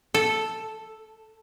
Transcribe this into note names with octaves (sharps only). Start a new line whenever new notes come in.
A4